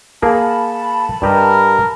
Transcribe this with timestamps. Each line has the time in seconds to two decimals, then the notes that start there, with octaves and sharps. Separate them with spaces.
0.22 A#3 G#4 A#4 A5 B5
1.22 G2 G4 A#4 D#5